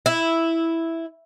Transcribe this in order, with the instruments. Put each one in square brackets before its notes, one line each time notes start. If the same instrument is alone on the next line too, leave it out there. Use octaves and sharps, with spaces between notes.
[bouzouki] E4